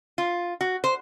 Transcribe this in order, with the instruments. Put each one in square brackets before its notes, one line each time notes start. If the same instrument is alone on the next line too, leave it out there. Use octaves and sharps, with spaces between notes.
[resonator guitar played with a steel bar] F4
F#4
C5